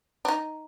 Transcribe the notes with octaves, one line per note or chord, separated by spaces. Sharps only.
D4
D#4